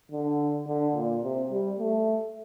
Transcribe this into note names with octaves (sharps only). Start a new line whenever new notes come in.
D3
D3
A#2
C3
G3
A3